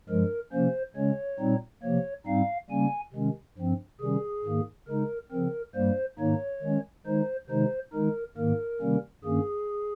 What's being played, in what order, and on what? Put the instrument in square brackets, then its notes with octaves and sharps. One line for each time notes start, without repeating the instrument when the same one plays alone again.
[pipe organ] G2 F3 G#3 A#4
C3 F3 A#3 C#4 C5
C#3 G#3 C#4 C#5
A#2 G3 C4 D#4
C3 F3 A#3 C#5
G#2 G3 C4 D#4 F5
C#3 G3 A#3 C#4 G#5
C3 D#3 G#3 C#4
G2 F3 C4
C3 D#3 G3 C#4 G#4
G#2 D#3 A#3
C#3 G#3 D#4 A#4
C#3 F3 C4 A#4
G2 G3 A#3 C5
G#2 D#3 A#3 D#4 C#5
D#3 G#3 C#4
D#3 G#3 D#4 C5
C3 D#3 G#3 D#4 C5
D#3 G#3 D#4 A#4
G#2 D#3 A#3 A#4
C3 D#3 G3 A#3 C#4
G2 D#3 A#3 C#4 G#4